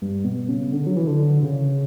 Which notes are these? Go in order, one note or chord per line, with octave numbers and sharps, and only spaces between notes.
G2
B2
C#3
D3
F#3
E3
D3
C#3